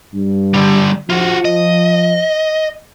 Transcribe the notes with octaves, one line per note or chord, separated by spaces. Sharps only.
G2
D3 G3
F3 F4 F#4
D#5